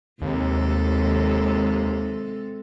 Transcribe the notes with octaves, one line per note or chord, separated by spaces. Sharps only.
D#2 C3 G#3 A4